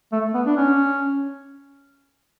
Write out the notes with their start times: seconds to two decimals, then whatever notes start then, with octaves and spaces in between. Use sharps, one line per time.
0.12 A3
0.34 B3
0.46 D4
0.57 C#4